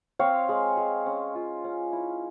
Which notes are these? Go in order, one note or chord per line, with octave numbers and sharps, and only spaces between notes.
C4 C#5 F5
G#3
G#3
C#4
F4
C#4
E4